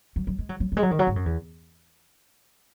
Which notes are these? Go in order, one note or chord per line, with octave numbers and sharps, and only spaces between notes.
F#3
F#3
G#3
F#3
F#3
F#3
G#3
F#3
D#3
F#3
G#2
F#2
E2